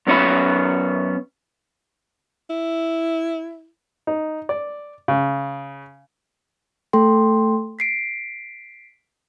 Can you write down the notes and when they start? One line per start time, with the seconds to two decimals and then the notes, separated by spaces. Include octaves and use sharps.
0.07 F#2 B3 C#4 C#5 E5 B5
2.50 E4
4.07 D#4
4.49 D5
5.08 C#3
6.93 A3 A4 G5 C6
7.79 B6 C7 D7